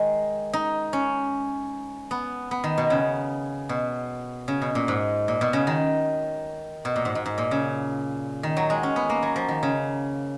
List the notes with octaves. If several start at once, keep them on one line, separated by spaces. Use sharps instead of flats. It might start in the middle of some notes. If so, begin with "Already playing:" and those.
Already playing: D#3 G#3
D#4
C#4
B3
B3
D#3
B2
C#3
B2
C#3
B2
A#2
G#2
A#2
B2
C#3
D#3
B2
A#2
G#2
G#2
G#2
A#2
C#3
D#3
F#3
G#3
C#4
B3
A#3
F#3
F3
D#3
C#3